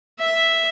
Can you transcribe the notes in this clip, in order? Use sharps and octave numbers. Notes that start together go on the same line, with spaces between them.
E5